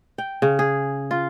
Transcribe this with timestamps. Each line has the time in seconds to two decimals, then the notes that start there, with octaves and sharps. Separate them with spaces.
0.18 G5
0.42 C#3
0.59 G#4
1.11 F4